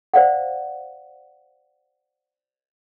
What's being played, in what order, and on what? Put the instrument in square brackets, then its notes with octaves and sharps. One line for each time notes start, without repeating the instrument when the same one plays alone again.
[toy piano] C5 D5 F5 F#5